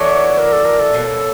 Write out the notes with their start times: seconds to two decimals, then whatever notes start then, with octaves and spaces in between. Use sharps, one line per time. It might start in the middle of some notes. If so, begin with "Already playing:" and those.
Already playing: E3 A3 D4 F#4 C#5
0.38 A#4
0.52 A4
0.65 A#4
0.79 A4
0.93 B2 F#3 A#3